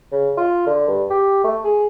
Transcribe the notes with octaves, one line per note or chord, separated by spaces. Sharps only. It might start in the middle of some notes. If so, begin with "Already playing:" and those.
C#3
F4
D3
G2
G4
A3
G#4